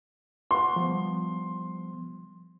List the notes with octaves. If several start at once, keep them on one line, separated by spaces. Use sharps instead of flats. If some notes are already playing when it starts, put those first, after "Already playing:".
F4 F#5 C6
F3 G3 B3